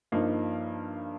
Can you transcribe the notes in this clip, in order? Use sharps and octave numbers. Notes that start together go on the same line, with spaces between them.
G2 F3 A#3 D#4